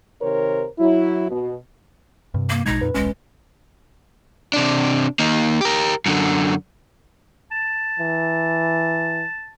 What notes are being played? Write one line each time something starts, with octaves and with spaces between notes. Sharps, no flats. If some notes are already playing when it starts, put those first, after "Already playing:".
C3 D#3 A#4 C5 C#5
F#3 E4
B2
G2 C3
A#3
A#1 B2 G#3 D#4 G#6 A#6
F2 A#2 B4
D#1 B1 G#3 C#4
C3 D4
D#3 A#3
G4 A#4
F#2 D3
A5
E3